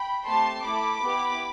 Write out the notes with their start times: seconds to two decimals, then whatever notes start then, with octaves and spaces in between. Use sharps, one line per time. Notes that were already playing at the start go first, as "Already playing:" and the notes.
Already playing: G5 B5
0.25 A3 C4 G4 A5 C6
0.63 A3 E4 A4 B5 D6
1.02 B3 E4 G4